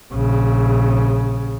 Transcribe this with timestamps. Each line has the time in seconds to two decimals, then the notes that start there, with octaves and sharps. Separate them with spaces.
0.13 A#1 C#3